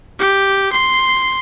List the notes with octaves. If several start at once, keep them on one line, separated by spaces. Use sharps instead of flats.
G4
C6